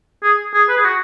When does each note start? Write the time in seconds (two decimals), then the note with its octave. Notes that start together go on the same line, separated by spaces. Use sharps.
0.23 G#4
0.54 G#4
0.69 B4
0.77 G#4
0.85 F#4